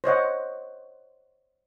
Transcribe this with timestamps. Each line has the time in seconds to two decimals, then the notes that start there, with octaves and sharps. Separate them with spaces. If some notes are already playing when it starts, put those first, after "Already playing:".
0.04 C5 C#5 D#5 F#5